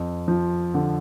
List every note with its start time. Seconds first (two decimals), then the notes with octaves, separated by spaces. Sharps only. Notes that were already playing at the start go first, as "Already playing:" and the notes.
Already playing: F2
0.28 F3
0.74 D3